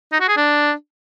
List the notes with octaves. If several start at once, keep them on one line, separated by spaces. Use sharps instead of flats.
D#4
F#4
G#4
D4